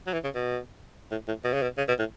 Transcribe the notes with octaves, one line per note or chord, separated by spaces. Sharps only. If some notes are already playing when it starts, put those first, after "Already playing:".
F#3
E3
C#3
B2
A2
A2
B2
C#3
B2
C#3
B2
A2